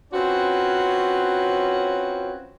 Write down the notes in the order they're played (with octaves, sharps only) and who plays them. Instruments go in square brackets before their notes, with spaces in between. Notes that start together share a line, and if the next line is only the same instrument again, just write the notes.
[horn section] C4 C#4 F4 F#4 B4 C#5